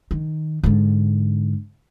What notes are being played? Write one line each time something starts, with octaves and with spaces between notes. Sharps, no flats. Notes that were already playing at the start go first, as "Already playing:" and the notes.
D#3
G#2 D3